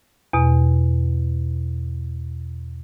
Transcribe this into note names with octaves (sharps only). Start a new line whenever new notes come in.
E2 B2